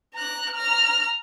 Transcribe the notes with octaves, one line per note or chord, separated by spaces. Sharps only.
A#5 F#6
A#5 F6